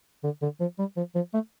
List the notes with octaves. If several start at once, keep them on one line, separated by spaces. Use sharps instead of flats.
D3
D3
F3
G3
F3
F3
A3